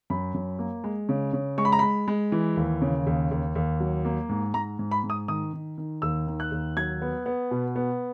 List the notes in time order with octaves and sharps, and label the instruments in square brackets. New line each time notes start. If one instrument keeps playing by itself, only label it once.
[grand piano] F#2 B5
F#2
A#3
G#3
C#3
C#3
G#3 C#6
B5
A#5
G#3 B5
G#3
E3
D#2
C#3
D#2
D#2
D#2
F#3
A#3
G#2
G#2 A#5
G#2
B5
G#2
D#6
D#3 D#6
D#3
D#3
D#2 E6
D#3
F#6
D#2
F#3 G#6
B3
B3
B2
B3